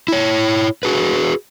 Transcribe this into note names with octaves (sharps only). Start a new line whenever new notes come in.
E4 C#5
F#4 G#4 B4